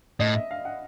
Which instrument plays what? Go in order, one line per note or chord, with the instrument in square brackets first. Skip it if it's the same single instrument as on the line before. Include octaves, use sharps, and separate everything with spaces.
[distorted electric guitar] A2 [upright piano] D#5
[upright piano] E5
F5
F#5